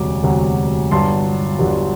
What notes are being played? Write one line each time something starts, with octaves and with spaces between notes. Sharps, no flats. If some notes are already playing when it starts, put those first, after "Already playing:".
Already playing: E1 D2 C3 F#3 D6
E1 D2 C3 F#3
G1 G2 F#3 A5 C6
G1 G2 F#3